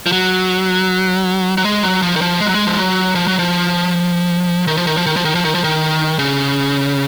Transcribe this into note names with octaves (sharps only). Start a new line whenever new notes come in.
F3
F#3
F#3
G#3
F#3
F3
D#3
F3
G#3
F#3
G#3
F3
F#3
F3
F#3
F3
D#3
F3
D#3
F3
D#3
F3
D#3
F3
D#3
F3
D#3
C#3